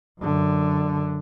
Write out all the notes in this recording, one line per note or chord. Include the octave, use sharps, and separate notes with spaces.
F#2 D3